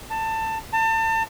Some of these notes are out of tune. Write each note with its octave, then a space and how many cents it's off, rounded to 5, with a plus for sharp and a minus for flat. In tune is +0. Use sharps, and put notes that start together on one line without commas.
A5 +20
A5 +35